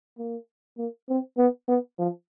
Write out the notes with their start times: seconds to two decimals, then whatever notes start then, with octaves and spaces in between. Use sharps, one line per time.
0.18 A#3
0.78 A#3
1.09 C4
1.38 B3
1.68 B3
1.98 F3